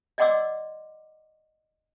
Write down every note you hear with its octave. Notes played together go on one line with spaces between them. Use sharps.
D5 D#5 F#5 C6 D6 E6